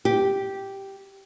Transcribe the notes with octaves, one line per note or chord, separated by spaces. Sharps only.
G4